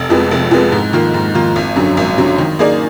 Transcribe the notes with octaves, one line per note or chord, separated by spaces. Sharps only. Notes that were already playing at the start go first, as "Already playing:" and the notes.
Already playing: F1
F2 F3 G#3 B3
F1
F2 F3 G#3 B3
G#2
D#3 A#3 F4
G#2
D#3 A#3 F4
G#1
F#2 D3 F#3
G#1
F#2 D3 F#3
D#3
A#3 D#4 G#4 D5